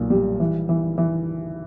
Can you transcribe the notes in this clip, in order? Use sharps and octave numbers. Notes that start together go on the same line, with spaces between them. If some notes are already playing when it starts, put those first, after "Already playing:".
Already playing: B1 A#2
G3
E3
E3
E3